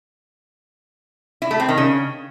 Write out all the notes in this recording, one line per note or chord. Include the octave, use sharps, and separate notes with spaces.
E4
A3
C4
D#3
C#3